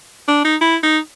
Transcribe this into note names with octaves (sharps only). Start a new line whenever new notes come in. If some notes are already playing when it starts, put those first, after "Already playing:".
D4
D#4
E4
D#4